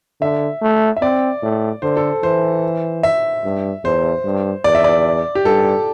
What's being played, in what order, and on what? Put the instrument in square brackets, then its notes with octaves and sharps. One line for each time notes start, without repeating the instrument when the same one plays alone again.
[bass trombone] D3 [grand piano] E5
[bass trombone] A3
[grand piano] E5
[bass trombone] C4 [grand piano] D5
[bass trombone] A2
[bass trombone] D3 [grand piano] C5
[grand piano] A4
[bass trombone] E3 [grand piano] C5
[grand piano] E5
[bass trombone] G2
[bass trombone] E2 [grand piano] C5
[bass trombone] G2
[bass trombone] E2 [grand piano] D5
[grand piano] E5
D5
G4
[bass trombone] G2 [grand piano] A4